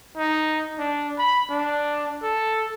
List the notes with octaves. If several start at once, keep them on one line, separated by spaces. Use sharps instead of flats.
D#4
D4
B5
D4
A4